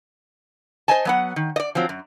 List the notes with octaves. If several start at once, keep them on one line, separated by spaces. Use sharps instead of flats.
C5 D5 D#5 G#5 A5
F#3 B3 F#5
D#3
D5 D#5
F3 F#3 C4
F#2